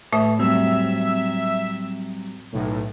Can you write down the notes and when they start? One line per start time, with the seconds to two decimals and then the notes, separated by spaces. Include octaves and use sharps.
0.12 A2 A3 B4 C#5 E5 D#6
0.39 F#3 G3 C4 E5 E6
2.53 B1 A2